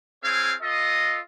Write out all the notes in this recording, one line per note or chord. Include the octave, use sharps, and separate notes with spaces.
C4 E4 G#4 C#5 F5
F4 A4 D#5